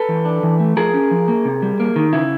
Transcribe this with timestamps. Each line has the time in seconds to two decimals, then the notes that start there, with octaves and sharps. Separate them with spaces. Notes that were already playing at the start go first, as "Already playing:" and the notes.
Already playing: A4 B4
0.09 E3
0.25 D4
0.43 E3
0.60 A3
0.77 F3 G#4 A#4
0.94 C#4
1.11 F3
1.28 A#3
1.45 C3
1.63 G3
1.80 A#3
1.96 D#3
2.13 C#3 E4